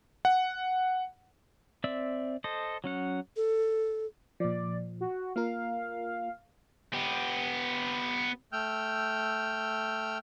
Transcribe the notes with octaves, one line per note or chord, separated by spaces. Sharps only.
F#5
C4 D5 E5 E6
A4 C5 D#5
F#3 C#4 F#5
A4
A#2 F3 D5
F#4
A#3 F4 A#4 F5
B3 G4
A3 G5 E6 F6 G6